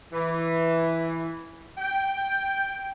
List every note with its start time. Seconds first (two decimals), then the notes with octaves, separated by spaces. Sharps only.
0.13 E3
1.78 G5